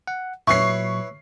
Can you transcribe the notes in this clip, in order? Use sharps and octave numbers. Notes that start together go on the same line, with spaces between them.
F#5
A#2 F#3 E4 B4 C#5 C#6 C7